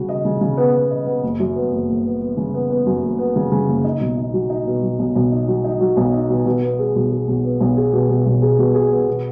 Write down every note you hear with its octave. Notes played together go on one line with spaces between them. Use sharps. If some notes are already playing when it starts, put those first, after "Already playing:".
Already playing: C#3 F#4
D#5
C#3
C#3
B3
B3
D#5
B3
F#1
F#2
B3
F#1
F#1
B3
B3
C#3
B3
B3
F#2
F#1
B3
C#3
C#3
F#1
D#4
B1
D#4
F#3
D#4
B2
F#3
B1
B1
D#4
F#3
D#4
F#3
B1
D#4
B2
B2
B3
G#4
B1
G#4
B1
B3
B1
G#4
B2
B2
B1
G#4
B2
G#4
B3
B2